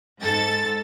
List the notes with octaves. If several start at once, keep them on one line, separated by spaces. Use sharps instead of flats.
G#2 A4 A6